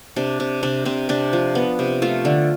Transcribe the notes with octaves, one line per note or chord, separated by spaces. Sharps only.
C3 D4
C3
C3 D4
C3 C4
C3 D4
F3
B3
C3
A3 F4
D3